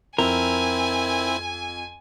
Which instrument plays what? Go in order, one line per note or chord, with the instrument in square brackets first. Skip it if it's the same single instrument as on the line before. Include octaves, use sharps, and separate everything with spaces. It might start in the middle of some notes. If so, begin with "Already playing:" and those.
[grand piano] F2 [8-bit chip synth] C4 E4 [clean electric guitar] A#4 [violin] G#5